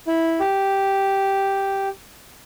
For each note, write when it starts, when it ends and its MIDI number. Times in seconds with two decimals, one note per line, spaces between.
0.07 0.40 64
0.40 1.89 67